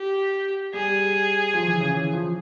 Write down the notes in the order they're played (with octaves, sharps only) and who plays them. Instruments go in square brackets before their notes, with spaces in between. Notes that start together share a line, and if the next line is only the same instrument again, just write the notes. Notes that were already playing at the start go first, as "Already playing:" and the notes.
Already playing: [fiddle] G4
[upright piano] G3 [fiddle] G#4
[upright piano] F3
E3
C#3
E3
F3